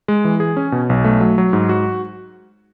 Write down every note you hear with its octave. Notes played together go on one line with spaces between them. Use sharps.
G#3
E3
G#4
C#4
B2
B1
A3
F#3
F#3
G#2
F#4